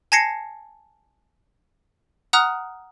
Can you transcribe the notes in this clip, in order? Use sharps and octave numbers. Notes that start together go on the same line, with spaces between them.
G#5 A5 G#6 A#6 C7 C#7
F#5 A#5 D#6 F6 F#6